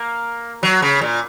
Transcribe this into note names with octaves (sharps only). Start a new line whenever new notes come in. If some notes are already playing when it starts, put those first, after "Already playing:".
Already playing: A#3
F#3
C#3
A#2